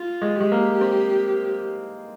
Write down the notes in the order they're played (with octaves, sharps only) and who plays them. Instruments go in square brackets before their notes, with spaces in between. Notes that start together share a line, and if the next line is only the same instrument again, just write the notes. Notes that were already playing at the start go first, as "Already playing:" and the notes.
Already playing: [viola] F4
[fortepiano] G#3
[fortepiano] G#3 [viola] G4
[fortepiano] A#3
C4